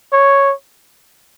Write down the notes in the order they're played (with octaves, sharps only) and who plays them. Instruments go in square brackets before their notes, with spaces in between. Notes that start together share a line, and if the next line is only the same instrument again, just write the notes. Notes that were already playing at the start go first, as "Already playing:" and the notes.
[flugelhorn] C#5